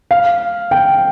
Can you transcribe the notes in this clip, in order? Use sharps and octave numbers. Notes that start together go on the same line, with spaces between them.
F5
G5